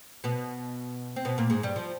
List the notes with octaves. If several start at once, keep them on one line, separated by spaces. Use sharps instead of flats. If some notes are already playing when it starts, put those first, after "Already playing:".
B2 B3
C4
B2 B3
A#2 A#3
G#2 G#3
G2 G3
F3